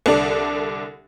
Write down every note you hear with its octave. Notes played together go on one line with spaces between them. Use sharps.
C2 D3 D4 D5